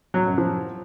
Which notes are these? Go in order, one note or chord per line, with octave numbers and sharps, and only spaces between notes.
F#3
F#2
F3